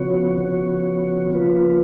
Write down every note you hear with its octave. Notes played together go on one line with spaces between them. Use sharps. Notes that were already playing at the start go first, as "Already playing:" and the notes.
Already playing: C#3 F3 B3 F#4 C#5
C#3 F3 B3 F#4 C#5
C#3 F3 A#3 F4 B4